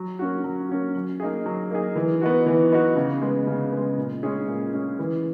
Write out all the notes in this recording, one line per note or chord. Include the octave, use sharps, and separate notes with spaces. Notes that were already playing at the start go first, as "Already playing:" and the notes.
Already playing: F#3
A#3 C#4 F#4
F#3
A#3 C#4 F#4
F#3
A#3 D#4 G#4
F#3
A#3 D#4 G#4
E3
B3 D#4 F#4
E3
B3 D#4 F#4
C#3
G#3 B3
C#3
B3
G#3
A#2
G#3 C#4 G#4
A#2
G#3 C#4 G#4
E3